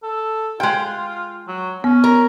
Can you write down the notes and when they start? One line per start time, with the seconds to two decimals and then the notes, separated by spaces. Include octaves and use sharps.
0.03 A4
0.60 G#3 F4 G5
1.48 F#3
1.84 B3 C#4
2.04 A#4